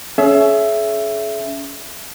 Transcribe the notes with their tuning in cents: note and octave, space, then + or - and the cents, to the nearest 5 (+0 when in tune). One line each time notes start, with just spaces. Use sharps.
C#4 +15 G#4 +40 E5 +10